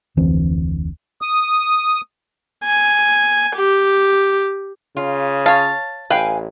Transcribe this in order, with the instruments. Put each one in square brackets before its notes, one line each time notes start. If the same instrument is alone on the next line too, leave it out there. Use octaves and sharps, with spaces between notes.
[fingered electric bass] F1 D2 E3 C4
[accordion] D#6
[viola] G#5
G4
[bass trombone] C#3 [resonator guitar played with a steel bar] F4
[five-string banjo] C#5 F5 [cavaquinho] A5
[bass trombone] A1 [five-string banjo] B4 G5 [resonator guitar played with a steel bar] F5 G#5